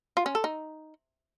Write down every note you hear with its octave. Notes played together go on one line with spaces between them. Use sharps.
F4
C#4
A4
D#4